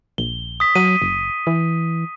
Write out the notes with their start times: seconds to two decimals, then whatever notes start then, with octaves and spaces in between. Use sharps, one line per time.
0.18 A#1 G7
0.60 D#6 B6
0.75 F#3 D#7
1.02 F#1
1.47 E3